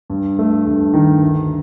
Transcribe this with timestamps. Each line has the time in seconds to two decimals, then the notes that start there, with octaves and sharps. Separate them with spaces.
0.10 G2
0.39 A3
0.67 G2
0.94 D#3
1.22 D2